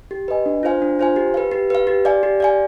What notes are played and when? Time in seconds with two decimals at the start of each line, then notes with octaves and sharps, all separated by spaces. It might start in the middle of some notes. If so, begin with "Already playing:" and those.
0.11 G4
0.28 B4 D#5 G#5
0.46 D4
0.63 F4 C5 F5 G#5
0.82 D4
0.99 F4 C5 F5 G#5
1.16 G4
1.34 B4 F5
1.51 G4
1.70 B4 F5
1.87 G4
2.05 D5 F5 G#5
2.23 G4
2.40 D5 F5 G#5